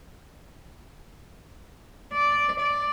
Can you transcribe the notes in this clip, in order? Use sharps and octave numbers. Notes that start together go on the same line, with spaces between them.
D5
D5